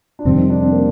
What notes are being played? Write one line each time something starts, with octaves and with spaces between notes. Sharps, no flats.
D4
F2 C3 D#3 G3 C4
D#4
D4
C4
A#3